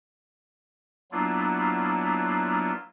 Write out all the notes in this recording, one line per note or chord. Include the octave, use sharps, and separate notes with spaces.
F#3 A#3 B3 D4 E4 F4